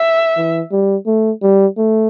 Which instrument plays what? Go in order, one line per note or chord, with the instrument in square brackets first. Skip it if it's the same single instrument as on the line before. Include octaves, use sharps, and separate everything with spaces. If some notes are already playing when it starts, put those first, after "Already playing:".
Already playing: [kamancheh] E5
[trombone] E3
G3
A3
G3
A3